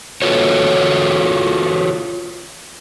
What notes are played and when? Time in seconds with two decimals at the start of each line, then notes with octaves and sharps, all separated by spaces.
0.22 F4 F#4 A4 B4 C#5